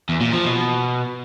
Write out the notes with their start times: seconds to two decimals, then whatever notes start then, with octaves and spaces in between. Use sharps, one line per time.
0.09 E2
0.21 A#2
0.33 F3
0.45 B2